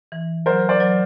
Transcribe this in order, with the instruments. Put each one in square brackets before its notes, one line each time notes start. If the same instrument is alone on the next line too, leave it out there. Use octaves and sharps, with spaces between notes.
[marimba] E3
[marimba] F#3 [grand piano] A#4 C5
[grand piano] C5 D5
[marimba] F#3